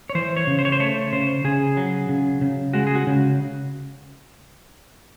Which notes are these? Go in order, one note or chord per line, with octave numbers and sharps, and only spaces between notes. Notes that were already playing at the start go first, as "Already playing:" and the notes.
C#5
E3 C5
C#5
C#3
C5
C#5
C5
A3 C#5
C#3 C5
C#3 G#4
F#3
C#3
C#3
G#3 F#4
G#4
F#4
C#3